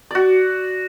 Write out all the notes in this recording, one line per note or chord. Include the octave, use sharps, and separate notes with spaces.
F#4 D5